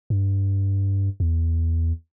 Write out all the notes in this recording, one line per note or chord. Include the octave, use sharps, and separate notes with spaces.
G2
E2